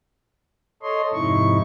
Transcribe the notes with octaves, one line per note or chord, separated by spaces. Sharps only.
A4 C#5 D#5 C6
F2 G#2 C3 D#4 E4 C#6